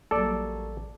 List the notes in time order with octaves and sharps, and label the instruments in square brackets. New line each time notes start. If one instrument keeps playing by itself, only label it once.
[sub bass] A1 [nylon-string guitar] F#3 G3 A#3 [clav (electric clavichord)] A4 D5